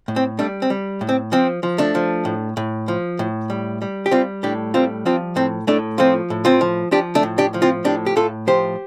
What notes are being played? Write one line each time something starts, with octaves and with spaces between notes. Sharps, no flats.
A2
C4
G3 A3 D4
C4
G3
A2
C4
F3 C4
F3
A3 D4
F3
A2
A2
F3
A2
G3
G3
G4
G3 C4 F4
A2 D4 G4
G3 C4 F4
F3 C4 F4
A2 C4
A2 A3 D4
F3 C4 F4
A2
C4 F4
F3
F3 D4 G4
A3 D4
A2
D4 G4
F3
C4 F4
A2 D4 G4
G4
A2 F4 A4
F3 G4 C5